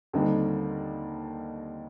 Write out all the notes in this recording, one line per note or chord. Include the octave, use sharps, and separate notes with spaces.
D#2 D3 G3 C4 D#4